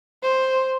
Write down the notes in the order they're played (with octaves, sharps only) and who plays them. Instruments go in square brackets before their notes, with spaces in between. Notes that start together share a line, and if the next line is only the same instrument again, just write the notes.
[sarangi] C5